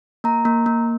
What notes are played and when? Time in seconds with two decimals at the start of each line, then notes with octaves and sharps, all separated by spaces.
0.24 A#3 A#5
0.45 A#3
0.66 A#3